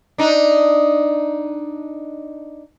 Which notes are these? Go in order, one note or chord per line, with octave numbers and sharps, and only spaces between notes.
D4 D#4